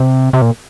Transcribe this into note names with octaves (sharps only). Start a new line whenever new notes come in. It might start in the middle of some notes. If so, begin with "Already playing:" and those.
Already playing: C3
C3
A#2